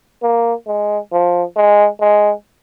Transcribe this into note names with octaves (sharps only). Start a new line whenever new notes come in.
A#3
G#3
F3
G#3
G#3